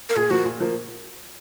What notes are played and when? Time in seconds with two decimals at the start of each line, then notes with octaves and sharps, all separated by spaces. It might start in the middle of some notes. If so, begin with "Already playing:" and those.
0.09 A#4
0.16 A#2 G#4
0.31 F3 A#3 F#4
0.45 A#2
0.60 F3 A#3